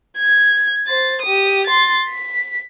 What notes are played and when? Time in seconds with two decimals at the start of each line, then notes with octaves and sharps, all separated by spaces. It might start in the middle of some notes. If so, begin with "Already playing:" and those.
0.18 G#6
0.87 C5 A6
1.22 G4 D#6
1.67 C6 A6
2.09 B6